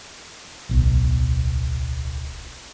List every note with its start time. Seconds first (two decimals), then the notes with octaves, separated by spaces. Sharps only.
0.69 D1 B1